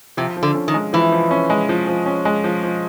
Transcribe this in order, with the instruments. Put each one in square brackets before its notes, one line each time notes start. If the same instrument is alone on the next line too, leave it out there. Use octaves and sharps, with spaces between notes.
[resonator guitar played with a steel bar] C3 [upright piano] F3
[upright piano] F3
[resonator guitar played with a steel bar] D3
[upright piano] C#4
[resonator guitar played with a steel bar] D#3
[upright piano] G#3
[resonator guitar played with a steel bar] E3 [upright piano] F3
[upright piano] F3
C#4
G#3
F3
F3
C#4
G#3
F3
F3